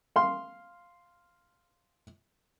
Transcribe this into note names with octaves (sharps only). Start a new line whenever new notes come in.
F5 C6